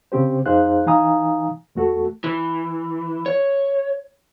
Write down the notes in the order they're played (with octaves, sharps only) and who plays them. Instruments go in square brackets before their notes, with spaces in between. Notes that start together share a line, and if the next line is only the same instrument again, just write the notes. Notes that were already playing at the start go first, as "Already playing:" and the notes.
[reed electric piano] C#3 C4 G4 C5
F2 D#4 G#4 C5 F5 F#6
E3 D#4 F5 G#5 A#5 D#6
E2 A3 F#4 A4
[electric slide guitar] E3
C#5